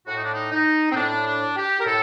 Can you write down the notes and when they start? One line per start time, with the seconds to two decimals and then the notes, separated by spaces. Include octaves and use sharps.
0.07 A2 F#4
0.16 D#4
0.24 D4
0.33 D#4
0.52 D#4
0.92 C4
0.96 A2 D4
1.26 D4
1.56 G4
1.80 A#4
1.85 A2 A4